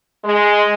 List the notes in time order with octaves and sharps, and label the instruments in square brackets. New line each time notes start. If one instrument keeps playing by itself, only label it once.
[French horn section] G#3